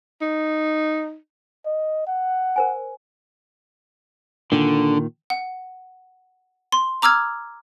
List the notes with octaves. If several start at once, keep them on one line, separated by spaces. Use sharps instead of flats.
D#4
D#5
F#5
A#4 C5 G#5
A#2 D3 D#3
F#5
C6
A#5 D6 E6 F6 G#6